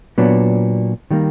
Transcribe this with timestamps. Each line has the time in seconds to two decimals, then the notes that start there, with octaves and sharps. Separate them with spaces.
0.18 A#2 F#3 B3 D4
1.11 D#3 G3 A#3